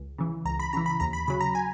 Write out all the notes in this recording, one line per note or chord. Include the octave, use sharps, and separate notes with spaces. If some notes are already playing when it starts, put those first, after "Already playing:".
Already playing: C#2
C#3 E3
C#2 A#5
B5
C#3 E3 A#5
B5
D#2 A#5
B5
C#3 F#3 B5
A#5
G#5